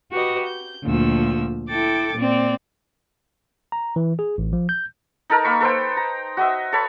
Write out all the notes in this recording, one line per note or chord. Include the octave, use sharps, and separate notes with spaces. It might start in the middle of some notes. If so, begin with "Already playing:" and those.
F#4 G4 B4 D#5
G6
D2 A#2 F3 E6
E4 A4 G5 D6 A6
A#2 C4 D5
A#5
E3
G#4
A1
F3
G6
D#4 A4 A#4
A#3 B5 C#6
A4 B4 C5 G5
A#5
F#4 D#5 E5
A4 C#5 B5